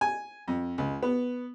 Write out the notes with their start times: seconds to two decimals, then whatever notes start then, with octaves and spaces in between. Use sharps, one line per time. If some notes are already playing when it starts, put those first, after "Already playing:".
0.01 G#5
0.48 F2
0.78 C#2
1.03 B3